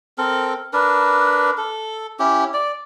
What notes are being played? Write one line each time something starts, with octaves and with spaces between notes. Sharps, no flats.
C4 A4 A#4
D4 A#4 B4
A4
C#4 E4 G4
D5